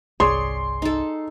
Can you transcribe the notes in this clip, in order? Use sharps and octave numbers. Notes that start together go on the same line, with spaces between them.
G1 C2 G#4 C#5 D5 C6
D#4 A4